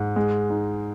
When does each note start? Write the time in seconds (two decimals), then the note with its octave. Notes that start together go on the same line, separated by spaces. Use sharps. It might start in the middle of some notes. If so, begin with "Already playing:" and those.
Already playing: G#2
0.16 G#3
0.50 D#4